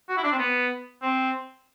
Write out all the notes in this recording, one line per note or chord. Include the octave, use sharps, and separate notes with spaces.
F#4
E4
D4
C4
B3
C4